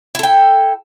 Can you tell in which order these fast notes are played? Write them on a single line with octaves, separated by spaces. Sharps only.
E4 A4 G5